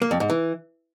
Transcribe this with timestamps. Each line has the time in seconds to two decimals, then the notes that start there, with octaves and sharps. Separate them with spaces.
0.02 A#3
0.11 F2
0.20 G#2
0.30 E3